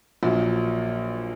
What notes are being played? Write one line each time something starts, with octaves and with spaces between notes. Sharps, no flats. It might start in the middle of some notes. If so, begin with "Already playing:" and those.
A#1 A#2 F#3